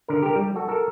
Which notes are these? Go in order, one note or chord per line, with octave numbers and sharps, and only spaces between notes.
D3 A#4
G4 A#4
G3
F#4 A4
A4 A#4